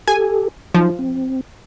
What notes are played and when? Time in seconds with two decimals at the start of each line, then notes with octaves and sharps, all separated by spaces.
0.08 G4 A4 G#5
0.75 F3 F#3 D#4
0.99 C4